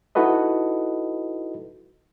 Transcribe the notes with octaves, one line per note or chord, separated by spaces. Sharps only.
D#4 E4 F#4 A4 B4 D#5